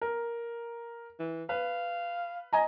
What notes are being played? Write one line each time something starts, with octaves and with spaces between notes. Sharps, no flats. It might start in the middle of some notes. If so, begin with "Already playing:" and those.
A#4
E3
B4 F5
D#5 G#5 A#5